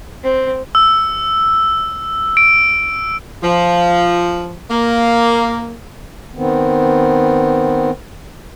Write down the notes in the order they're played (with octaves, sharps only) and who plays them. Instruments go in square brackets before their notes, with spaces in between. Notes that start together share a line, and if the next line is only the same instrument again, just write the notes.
[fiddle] C4
[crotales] E6
D7
[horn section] F3
A#3
[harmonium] D#3 B3 C4